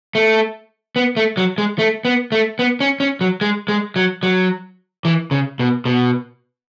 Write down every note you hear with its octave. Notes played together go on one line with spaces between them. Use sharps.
A3
B3
A3
F#3
G#3
A3
B3
A3
B3
C#4
C#4
F#3
G#3
G#3
F#3
F#3
E3
C#3
B2
B2